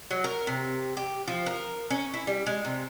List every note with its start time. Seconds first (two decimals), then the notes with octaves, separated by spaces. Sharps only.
0.11 F#3
0.24 A#4
0.47 C3
0.97 G4
1.28 F3
1.46 A#4
1.90 C#4
2.14 E4
2.27 G3
2.46 G#3
2.65 C3